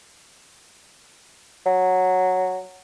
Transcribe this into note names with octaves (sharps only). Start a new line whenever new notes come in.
F#3